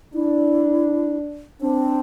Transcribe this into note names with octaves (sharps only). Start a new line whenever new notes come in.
D4 E4
C4 D4